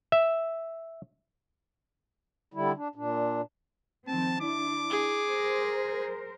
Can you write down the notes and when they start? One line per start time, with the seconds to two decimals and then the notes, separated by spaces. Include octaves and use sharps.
0.12 E5
2.54 D3 G3 E4
2.77 D4
2.95 A#2 D4
4.07 D#3 F3 C4 A5
4.40 D4 E4 D6
4.90 G#4
5.25 A#4 C5